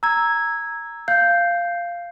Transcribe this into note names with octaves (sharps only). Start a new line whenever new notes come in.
A#5 E6 G#6
F5 G6